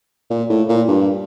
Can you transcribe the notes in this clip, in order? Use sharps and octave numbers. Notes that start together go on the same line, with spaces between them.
A#2
A2
A#2
G2